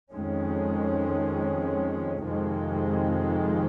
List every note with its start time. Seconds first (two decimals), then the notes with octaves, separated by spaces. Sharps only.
0.12 F2 D#3 G#3 C#4
2.24 F2 C3 D#3 G#3